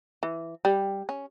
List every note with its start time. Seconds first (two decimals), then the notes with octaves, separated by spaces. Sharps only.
0.23 E3
0.65 G3
1.09 C#4